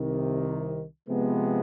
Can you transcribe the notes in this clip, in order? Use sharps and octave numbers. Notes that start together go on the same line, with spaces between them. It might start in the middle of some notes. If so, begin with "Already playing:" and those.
Already playing: C2 C3 D#3
C3 F3 G#3 B3